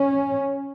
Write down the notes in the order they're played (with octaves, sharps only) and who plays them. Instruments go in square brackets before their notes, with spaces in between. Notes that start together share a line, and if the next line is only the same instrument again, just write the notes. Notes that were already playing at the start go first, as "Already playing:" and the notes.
Already playing: [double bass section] C#4